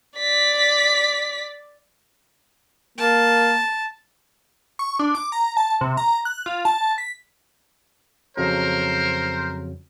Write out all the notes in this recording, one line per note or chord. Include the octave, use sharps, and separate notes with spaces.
D5 B6
A#3 A5
C#6
D4
D6
A#5
A5
C3
A#5
F#6
F4
A5
B6
F2 C#3 F#3 A#4 C5